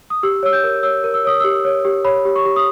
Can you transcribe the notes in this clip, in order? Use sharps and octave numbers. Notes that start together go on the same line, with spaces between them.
D#6
G4 E6
C#5 E6
G6
A#4
C#5 E6
A#4
E6
C#5 D#6
G4 E6
C#5
G4
C#5 B5
G4
C#6
G4
D#6